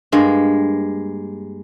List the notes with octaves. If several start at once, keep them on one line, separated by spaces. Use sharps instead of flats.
G2 G#3 A#3